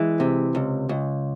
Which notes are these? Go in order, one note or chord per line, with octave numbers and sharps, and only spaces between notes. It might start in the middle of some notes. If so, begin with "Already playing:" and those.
Already playing: E3 G#3
C3
C#2
C#2